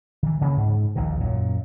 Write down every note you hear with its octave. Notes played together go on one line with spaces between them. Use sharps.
D#3 E3
C#3 E3 A#3
G#2
A#1 D#2 A#2 D#3
F#2 A#2